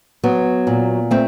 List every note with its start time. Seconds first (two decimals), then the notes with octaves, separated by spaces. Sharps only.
0.24 F#3 B3
0.67 A#2
1.11 A3 C4